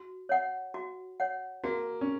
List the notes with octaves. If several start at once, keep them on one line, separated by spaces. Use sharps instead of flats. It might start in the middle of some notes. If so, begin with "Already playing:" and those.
Already playing: F#4
C#5 F#5
F#4
C#5 F#5
A#3 F#4
C#4